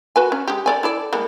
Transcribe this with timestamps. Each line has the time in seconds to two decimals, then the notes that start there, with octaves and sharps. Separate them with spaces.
0.16 F#4 B4 G#5
0.32 C#4
0.48 G#3 G4
0.66 A4 D5 G#5
0.83 E4 A4 D5
1.13 G3 G#3 A#3